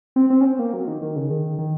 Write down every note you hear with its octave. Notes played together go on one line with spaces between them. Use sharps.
C4
C4
C#4
C4
A#3
F#3
D#3
D#3
C#3
D#3
D#3